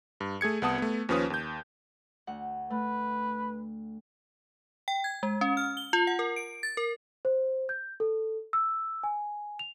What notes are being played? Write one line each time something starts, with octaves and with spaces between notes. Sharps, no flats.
G2
A3 G#4 G#6 C#7
C2 B3 F#5 A5 D#6
A3 B3
D#2 F3 C#4 B4 D#6
D#2 G6
D2 F#5
A3 B4
G5
G#6
G#3
C#4
F6
G7
F4
F#5
A#4
D7
A6
A#4
C5
G6
A4
E6
G#5
F7